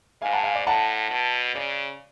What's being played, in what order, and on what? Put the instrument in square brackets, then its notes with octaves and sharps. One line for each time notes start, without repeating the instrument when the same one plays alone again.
[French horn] G#2 [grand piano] F5 G#5
[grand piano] F#5 A5
F5 G#5
D5
[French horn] A2 [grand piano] F#5 A5
[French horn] B2
[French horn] C#3 [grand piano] D5